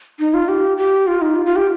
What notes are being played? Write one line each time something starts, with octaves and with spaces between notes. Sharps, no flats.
D#4
F4
G4
G4
F4
D#4
F4
F4
G4